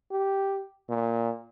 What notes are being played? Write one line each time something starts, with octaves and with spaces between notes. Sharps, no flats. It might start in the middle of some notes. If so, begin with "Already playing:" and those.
G4
A#2